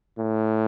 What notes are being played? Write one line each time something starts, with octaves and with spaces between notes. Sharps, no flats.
A2